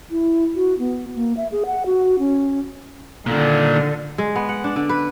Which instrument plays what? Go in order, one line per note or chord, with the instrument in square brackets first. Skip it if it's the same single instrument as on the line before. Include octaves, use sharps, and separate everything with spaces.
[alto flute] E4
F#4
B3
A#3
E5
G#4
F#5
F#4
C#4
[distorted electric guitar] A#2 D#3 [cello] D3
[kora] G#3
B3
F#5
D4
D3
B4